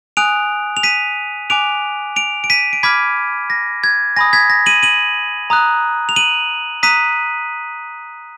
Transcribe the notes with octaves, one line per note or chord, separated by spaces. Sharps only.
G#5 D#6 F#6 D7 F7
F7
B6 D#7
G#5 D6 F#6 D7 F7
D7 F7
D7
B6 D#7
D7
B5 D6 F6 G#6 B6
A#6
G#6
G#5 B5 D#6 A#6
G#6 B6
A#6
D#7 F#7
D#7 F#7
A#5 D#6 F#6
F7
D#7 F#7
A#5 D#6 F#6 B6 D#7